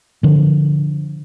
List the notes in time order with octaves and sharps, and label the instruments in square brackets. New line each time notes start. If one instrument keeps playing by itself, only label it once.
[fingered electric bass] D3 F3